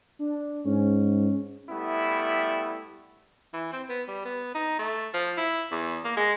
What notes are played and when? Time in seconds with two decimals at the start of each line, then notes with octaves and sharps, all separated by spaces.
0.19 D4
0.65 G#2 C#4
1.70 G3 A3 B3 E4
3.54 E3
3.73 C4
3.89 B3
4.08 G3
4.25 B3
4.55 D#4
4.79 A3
5.14 F3
5.37 E4
5.71 E2
6.04 A#3
6.17 G#3